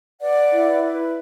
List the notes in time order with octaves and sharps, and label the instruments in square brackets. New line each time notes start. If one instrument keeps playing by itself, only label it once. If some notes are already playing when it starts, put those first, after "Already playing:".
[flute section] B4 D5 F#5
E4
B4